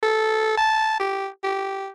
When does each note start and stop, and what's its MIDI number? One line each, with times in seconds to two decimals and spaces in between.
0.03 0.53 69
0.57 0.97 81
1.00 1.27 67
1.43 1.89 67